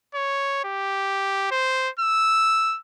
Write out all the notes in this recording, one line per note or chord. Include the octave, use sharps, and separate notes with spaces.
C#5
G4
C5
E6